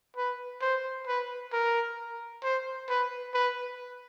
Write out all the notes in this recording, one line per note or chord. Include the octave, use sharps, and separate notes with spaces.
B4
C5
B4
A#4
C5
B4
B4